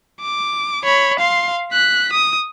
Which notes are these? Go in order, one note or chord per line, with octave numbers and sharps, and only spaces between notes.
D6
C#5 B5
F5 C6
F#6 B6
D#6